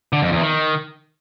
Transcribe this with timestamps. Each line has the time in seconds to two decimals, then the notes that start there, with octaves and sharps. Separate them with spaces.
0.13 D3
0.22 F2
0.32 E2
0.42 D#3